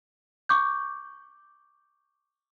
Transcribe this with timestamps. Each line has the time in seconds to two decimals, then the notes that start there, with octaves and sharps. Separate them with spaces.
0.49 C#6 D6 G6